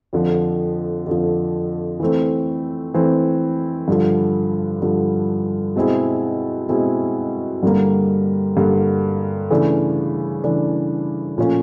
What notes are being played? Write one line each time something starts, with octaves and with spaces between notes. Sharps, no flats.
F2 D3 F3
F2 D3 F3
E3 A3 C4
E3 A3 C4
G2 D3 F3
G2 D3 F3
B2 G#3 C4 E4 G#4
B2 G#3 C4 E4 G#4
G2 D3 G3 A#3
G2 D3 G3 A#3
C#3 E3 A3 D4
C#3 E3 A3 D4
A#2 F3 A3 C#4 F4